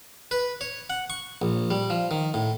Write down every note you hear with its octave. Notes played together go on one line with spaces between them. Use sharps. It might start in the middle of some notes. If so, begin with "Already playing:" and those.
B4
C#5
F#5
C#6
A#1
G3
F3
D#3
A2